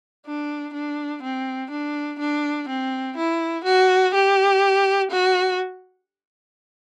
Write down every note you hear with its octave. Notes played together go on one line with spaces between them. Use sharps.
D4
D4
C4
D4
D4
C4
E4
F#4
G4
F#4